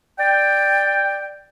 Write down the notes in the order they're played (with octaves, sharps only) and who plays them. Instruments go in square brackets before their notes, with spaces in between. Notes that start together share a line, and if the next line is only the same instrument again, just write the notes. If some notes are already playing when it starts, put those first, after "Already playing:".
[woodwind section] D5 G5